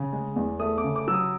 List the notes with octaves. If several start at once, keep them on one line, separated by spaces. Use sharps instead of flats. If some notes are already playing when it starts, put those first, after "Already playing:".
Already playing: C#3
G#3
E2
A3 D#6
D6
C#3
D6
F#3 E6
D#6